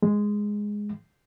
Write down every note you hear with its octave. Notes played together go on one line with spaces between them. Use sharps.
G#3